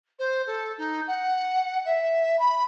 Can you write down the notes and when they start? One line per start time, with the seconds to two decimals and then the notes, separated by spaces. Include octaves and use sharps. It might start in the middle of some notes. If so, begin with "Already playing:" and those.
0.18 C5
0.46 A4
0.77 D#4
1.07 F#5
1.84 E5
2.38 B5